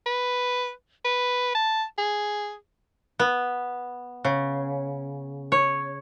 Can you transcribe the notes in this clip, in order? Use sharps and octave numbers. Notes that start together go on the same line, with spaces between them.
B4
B4
A5
G#4
B3
C#3
C#5